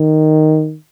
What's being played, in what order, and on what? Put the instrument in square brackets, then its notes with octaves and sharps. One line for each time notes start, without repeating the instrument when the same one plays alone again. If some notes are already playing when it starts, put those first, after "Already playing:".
Already playing: [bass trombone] D#3